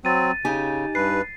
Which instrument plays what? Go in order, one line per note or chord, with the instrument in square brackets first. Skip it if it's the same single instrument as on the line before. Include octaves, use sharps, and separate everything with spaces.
[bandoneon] F#3 C4 [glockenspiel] A6 D#7
[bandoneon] C#3 [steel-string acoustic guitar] D#4 G4 G#5
[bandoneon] G2 B4 [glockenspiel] C7